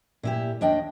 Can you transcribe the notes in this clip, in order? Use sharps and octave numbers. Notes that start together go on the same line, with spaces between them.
A#2 E4 G4
D#2 D4 D#5 G5